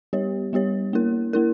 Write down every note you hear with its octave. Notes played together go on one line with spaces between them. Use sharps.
G3 B3 G4 C#5
G3 B3 G4 C#5
A#3 E4 A#4
A#3 E4 A#4